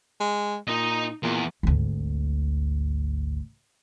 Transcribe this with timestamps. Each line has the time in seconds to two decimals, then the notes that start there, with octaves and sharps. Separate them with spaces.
0.20 G#3
0.68 A#2 D#4 D#5
1.23 E2 A#2
1.63 G#1 D2